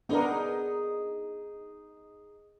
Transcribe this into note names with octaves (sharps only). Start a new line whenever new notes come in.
B3 D4 D#4 G#4 A#4